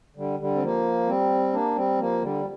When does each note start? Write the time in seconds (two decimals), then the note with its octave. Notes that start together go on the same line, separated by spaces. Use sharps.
0.16 D3 G3
0.39 D3 G3
0.55 C4
0.62 F3 A#3
1.07 G3 C4
1.53 A#3 D4
1.76 G3 C4
1.98 F3 A#3
2.22 D3 G3